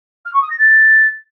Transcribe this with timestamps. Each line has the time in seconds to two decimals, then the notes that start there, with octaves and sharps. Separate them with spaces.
0.25 F6
0.33 C#6
0.41 D#6
0.50 A#6
0.58 A6